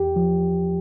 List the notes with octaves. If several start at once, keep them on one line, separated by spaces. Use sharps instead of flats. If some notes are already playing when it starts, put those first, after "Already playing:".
Already playing: E2 G4
F3